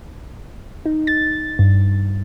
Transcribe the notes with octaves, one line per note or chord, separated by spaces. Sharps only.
D#4
A6
G2